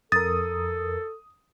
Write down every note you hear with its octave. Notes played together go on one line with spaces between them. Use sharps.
F2 A4 A#4 D#6 A6